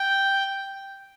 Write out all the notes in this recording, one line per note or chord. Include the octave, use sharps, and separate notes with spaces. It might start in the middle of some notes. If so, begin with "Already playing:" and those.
Already playing: G5